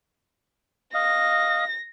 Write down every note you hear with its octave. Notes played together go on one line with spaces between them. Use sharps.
D#5 F5 A#6